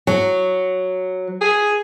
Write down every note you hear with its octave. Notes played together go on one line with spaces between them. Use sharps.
F#3
G#4